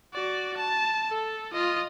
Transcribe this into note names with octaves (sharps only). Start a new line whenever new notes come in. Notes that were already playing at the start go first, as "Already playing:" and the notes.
F#4 D5
A5
A4
F4 D#5